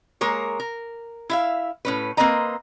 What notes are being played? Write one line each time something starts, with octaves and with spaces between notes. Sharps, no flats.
G#3 A#3 A#4 C#5
A#4
E4 E5 F5
A2 C#4 B4
A#3 C4 B4 C5 D#5 A#5